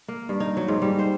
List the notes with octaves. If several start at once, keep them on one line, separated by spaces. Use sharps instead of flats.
A#3
G2
D#4
F#3
G#2
G3
C5